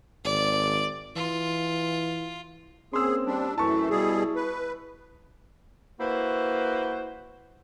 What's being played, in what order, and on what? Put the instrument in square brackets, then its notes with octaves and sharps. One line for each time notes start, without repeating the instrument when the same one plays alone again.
[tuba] G#1 [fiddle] D5
[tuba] E3 [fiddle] F4
[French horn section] A#3 C4 C#4 [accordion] G#4 [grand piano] C6 E6
[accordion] G3 D4
[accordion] F#2 E3 A3 [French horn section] E4 [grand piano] A5 C#6
[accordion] B2 G3 G#4
B4
[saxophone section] A#3 E4 F#4 B4 C5